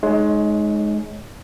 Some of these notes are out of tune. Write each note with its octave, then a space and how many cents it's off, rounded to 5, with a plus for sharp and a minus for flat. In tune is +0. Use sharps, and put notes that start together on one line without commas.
G#3 +25 D#4 -10 C#5 +10